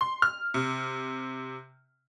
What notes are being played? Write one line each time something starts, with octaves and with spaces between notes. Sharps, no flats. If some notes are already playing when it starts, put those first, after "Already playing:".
C6
F6
C3